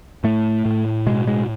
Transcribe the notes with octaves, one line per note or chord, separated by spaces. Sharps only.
A2 A3
A2
B2 G#3
G#3